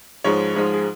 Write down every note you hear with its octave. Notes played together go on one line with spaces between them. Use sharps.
G#2 F3 G#3 C#5
G#2 F3 G#3
G#4